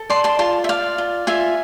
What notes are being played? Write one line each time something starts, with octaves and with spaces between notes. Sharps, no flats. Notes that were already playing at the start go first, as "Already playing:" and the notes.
Already playing: A4
D5 A5 C6
A5 C6
F4 A5 C6
E5
D5 F5
F4
F4 E5 G#5